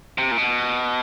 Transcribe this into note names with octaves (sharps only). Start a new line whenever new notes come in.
C3
A#2
B2